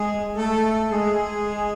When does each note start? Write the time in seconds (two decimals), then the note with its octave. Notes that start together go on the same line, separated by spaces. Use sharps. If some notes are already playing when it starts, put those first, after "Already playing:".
Already playing: G#3 G#4
0.36 A3 A4
0.91 G#3 G#4